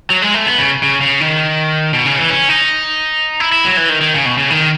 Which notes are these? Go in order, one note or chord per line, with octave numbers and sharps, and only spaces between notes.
F#3
G#3
A3
B3
C#3
C#3
C#3
D#3
B2
C#3
E3
C#4
D#4
E4
E4
F#3
E3
D#3
D#3
C#3
B2
C#3
D#3